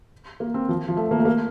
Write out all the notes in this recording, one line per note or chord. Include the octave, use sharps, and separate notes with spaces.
A#3
C4
F3
F3
A3
A#3
A3
A#3